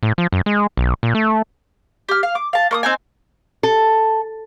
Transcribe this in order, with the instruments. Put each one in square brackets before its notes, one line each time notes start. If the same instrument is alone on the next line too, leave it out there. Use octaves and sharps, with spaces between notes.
[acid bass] A2
F3
F#2
G#3
B1
A#2
A3
[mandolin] G4 F6
F5
D6
F5 A5
A#3 C#6 D#6
C4 D#4 G#5
[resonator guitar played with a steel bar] A4